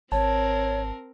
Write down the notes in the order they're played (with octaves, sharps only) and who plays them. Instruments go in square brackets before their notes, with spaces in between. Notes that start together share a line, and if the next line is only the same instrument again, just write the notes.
[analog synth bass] G#1 [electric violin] C4 A#4 [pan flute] C#5 [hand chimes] A5